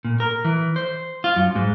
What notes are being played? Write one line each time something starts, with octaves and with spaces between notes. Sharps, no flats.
A#2
A#4
E3
C5
F4
F#2
G#2